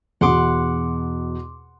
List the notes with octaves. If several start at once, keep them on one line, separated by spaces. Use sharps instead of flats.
E2 B2 F#5 C6 D6